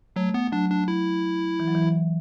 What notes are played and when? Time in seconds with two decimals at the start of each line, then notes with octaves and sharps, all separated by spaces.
0.16 F#3 A3
0.34 B3
0.52 F#3 D4
0.70 D4
0.88 E4
1.60 E3
1.68 F#3
1.75 E3